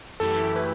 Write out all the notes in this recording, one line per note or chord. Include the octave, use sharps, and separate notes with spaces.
F#2 E3 A3 E4 G4 A4
B4